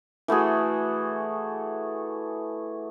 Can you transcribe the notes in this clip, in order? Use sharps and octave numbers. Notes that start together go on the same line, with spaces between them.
E3 A3 F#4 G#4